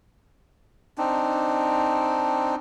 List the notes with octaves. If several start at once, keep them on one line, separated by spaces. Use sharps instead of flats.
C4 D4 D#4